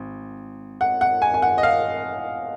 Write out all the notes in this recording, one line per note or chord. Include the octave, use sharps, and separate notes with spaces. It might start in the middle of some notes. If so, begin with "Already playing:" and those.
Already playing: G#1
F#5
F#5
G#5
G#5
F#5
D#5
F5